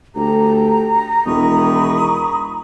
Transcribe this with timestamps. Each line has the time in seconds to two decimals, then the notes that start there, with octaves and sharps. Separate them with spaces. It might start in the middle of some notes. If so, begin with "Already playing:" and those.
0.16 D2 G4 A4 A#5
1.26 E1 D#3 E3 B5 C#6 D#6